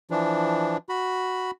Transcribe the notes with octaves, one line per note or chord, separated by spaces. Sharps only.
E3 F3 D4
F#4 B5